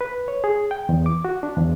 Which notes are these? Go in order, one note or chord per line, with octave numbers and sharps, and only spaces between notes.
B4
C#5
G#4
G5
E2
D6
F#4
D4
E2